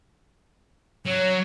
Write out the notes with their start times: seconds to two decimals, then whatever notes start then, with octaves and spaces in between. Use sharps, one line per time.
1.06 F#3 C#5